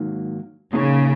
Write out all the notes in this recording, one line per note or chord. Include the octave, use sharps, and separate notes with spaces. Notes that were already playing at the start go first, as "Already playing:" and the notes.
Already playing: G#2 D#3 F#3 A#3
A#2 C#3 A#3 D#4 G#4 C#5